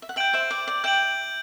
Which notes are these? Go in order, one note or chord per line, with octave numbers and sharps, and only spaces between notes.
E5
F#5
E5 G5 G6 D7 F#7
C5 E5
D5
D5
E5 G5 G6 D7 F#7